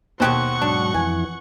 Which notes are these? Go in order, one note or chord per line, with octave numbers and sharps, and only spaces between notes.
D#2 B2 F#3 G4 C5 F#5 C#6 F#6
G#2 F#3 D4
F2 E3 G#5